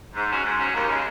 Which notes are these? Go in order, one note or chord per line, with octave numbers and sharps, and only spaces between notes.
G#2
F#3 C#4 F#4
G#2
F#3 C#4 F#4
D#2
C#3 G#3